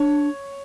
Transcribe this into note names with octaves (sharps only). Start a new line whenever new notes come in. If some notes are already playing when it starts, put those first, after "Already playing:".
Already playing: D4 C#5